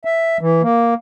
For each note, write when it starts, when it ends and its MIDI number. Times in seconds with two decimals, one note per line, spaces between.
0.05 0.38 76
0.41 0.62 52
0.62 0.94 58